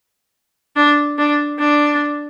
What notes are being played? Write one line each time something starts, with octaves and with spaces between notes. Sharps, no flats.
D4
D4
D4